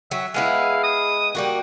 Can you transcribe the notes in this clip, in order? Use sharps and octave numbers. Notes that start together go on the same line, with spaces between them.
F#3 E5
G#3 B3 E4 F5
D#6
G3 A#3 F#4